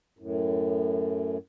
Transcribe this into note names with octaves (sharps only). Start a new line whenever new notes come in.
F#2 A2